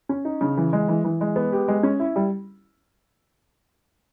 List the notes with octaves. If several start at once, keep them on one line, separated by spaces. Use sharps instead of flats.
C#4
D#4
C#3
E3
G#3
E3
E3
G#3
B3
G4
G#3
C#4
E4
G3